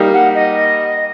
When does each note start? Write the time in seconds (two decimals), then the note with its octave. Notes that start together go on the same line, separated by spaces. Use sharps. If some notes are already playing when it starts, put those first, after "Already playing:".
Already playing: G3 A#3 D#4 G4
0.14 F#5
0.35 D#5